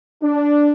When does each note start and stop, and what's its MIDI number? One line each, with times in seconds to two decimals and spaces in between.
0.23 0.72 62